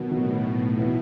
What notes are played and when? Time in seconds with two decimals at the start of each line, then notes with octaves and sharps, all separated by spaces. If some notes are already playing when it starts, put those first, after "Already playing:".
Already playing: B2 D#3 F#3 B3 F#4
0.10 A2 D#3 F#3 B3 F#4
0.77 E3 B3 E4